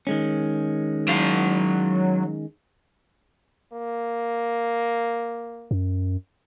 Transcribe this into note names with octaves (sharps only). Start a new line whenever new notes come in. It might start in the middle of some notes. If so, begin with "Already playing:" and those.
D#3 G#3 C#4
F#3 F5
A#3
F#2